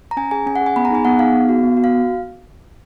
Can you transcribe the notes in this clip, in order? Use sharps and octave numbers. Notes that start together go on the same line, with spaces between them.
A#5
C#4 G#5
G#4 G#5
C#4 G#5
F#5
G#4
G#5
B3 B5
A#5
D#4 G#4 G#5
B3 F#5
D#4 G#4 F5
B3
F#4
B3
F#4
F5